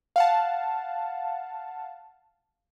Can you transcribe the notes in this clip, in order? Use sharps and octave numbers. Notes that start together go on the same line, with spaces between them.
F5 F#5 A5